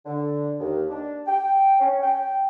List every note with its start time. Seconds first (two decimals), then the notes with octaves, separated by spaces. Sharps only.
0.06 D3
0.60 D#2
0.90 D4
1.27 G5
1.80 C#4
2.02 G5